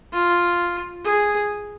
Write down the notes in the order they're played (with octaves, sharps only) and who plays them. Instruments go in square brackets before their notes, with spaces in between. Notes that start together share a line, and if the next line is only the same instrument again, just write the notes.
[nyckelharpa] F4
G#4